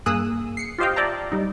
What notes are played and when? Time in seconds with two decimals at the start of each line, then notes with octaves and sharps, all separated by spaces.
0.06 G2 A#3 G#4 D#6 E6 F#6
0.57 C7 C#7
0.78 F4 G4 C5 D#5 F5 G5
0.96 D5 E5 G5 A5 A#5
1.32 G3 D#4